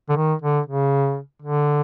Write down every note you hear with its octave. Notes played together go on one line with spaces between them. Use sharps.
D3
D#3
D3
C#3
D3